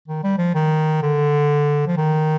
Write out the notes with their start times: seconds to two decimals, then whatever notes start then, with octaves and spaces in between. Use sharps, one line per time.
0.08 D#3
0.24 G3
0.38 F3
0.55 D#3
1.02 D3
1.87 F3
1.97 D#3